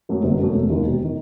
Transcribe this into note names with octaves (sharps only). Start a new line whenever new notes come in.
F#2 F#3 A3
G1
F#2 F#3 A3
E1
D#2 D#3
E1
D#3